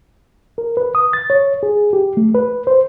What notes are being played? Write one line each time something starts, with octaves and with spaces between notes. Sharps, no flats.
A#4
B4
D#6
A6
C#5
G#4
G4
A3
B4
C5